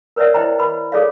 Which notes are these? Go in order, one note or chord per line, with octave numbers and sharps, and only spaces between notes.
A#4 B4 C#5 D5 E5 F#5
E4 C5 D#5 G5 A#5
B4 B5
G#4 A4 C#5 D5 F5